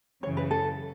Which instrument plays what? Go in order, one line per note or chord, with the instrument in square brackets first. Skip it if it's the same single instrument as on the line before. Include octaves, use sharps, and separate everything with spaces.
[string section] F#2 C#3 E3 [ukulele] C#5
[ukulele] B4
A4